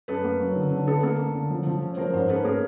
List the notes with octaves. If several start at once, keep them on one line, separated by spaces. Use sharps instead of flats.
F#2 A4 B4
A#3
F#3
D3
D3
D3 A4 B4
A#3 A4
A#3
D3
F3
F3
C#4
F3 A#4 C5
G#2 A#4 C5
C#4 A4 B4
A#3 G#4 A#4